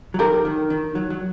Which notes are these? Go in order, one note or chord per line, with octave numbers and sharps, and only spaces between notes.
F#3
D#3 G4 A#4
D#3
D#3
F#3
F#3